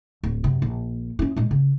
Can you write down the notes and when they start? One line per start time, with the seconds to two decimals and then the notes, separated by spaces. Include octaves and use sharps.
0.23 D1
0.44 F#2 C3
0.62 A#1
1.19 C#4 E4
1.36 A#2 G#3
1.51 C#3